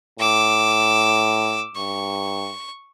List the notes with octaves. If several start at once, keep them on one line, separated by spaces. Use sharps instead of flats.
A2 D6 E6
G2 C#6